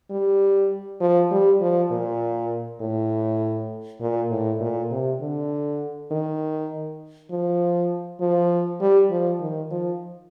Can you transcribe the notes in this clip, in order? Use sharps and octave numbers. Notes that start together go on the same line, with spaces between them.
G3
F3
G3
F3
A#2
A2
A#2
A2
A#2
C3
D3
D#3
F3
F3
G3
F3
D#3
F3